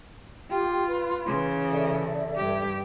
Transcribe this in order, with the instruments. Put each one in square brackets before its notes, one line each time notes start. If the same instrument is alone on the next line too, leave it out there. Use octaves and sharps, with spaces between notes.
[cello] F4 [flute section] G4 G5
[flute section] B4 C6
[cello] C#3 E3
[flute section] A4 D5 E5
[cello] G2 G4